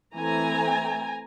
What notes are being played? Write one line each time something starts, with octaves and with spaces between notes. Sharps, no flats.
E3 A3 C4 E4 G#5 A#5